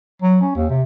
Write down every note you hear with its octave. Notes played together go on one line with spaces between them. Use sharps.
F#3
C#4
D#2
C3